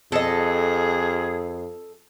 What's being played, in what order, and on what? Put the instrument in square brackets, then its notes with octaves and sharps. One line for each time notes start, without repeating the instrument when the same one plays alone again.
[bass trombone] F2 [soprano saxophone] G#4 [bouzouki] A4 D#5